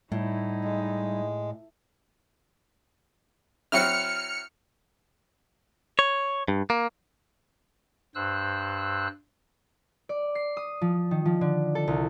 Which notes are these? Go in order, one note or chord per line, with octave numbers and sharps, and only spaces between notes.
A2 G3 D#4 E4
G#3
F#3 C4 E4 F6 C#7
C#5
G2
A#3
G2 C5 E6 F#6
D5
C7
D#6
F3
D#3
F3
D3
A4
C2